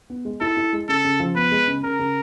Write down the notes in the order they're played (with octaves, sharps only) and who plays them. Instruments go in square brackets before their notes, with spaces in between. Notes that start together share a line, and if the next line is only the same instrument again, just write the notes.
[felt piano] B3
G#3
[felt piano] E4 [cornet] A4
[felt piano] E4
G#3
[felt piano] C#3 [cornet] A4
[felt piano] C#3
F3
[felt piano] B3 [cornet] B4
[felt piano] G#3
C#3
[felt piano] C#3 [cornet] A#4
[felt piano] C#3